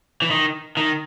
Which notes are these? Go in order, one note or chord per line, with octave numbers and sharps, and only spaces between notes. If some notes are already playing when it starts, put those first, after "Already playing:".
E3
D#3
D#3